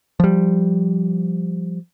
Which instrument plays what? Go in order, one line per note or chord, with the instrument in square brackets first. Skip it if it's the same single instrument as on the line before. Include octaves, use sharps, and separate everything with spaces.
[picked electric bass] F3 G3